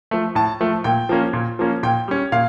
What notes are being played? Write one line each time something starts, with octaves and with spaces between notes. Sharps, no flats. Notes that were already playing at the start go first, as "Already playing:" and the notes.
F3 A3
A2 A5
F3 A3
A#2 G5
F3 A#3 C#4
A#2
F3 A#3 C#4
A#2 G5
G3 C#4
A#2 F5